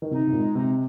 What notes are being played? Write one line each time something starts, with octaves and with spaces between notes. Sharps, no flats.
D#3
C3 D#4
C3
A#2 G#3
C3 D#4